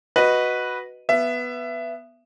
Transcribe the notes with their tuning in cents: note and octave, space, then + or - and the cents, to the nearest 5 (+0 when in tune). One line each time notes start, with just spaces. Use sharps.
F#4 +0 B4 +0 D#5 +0
B3 +0 E5 +25